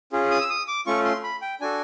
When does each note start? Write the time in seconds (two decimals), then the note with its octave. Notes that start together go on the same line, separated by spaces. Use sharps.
0.12 C#4 F4 G#4
0.31 D#6
0.41 E6
0.50 D#6
0.68 D6
0.86 A3 C#4 F4 C#6
1.05 C6
1.23 B5
1.42 G5
1.61 D4 F#4 A4 G#5